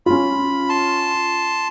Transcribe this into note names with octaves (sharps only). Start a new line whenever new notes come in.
C#4 F4 B5
A5 C6